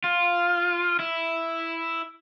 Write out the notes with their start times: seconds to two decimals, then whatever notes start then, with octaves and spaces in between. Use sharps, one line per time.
0.04 F4
0.99 E4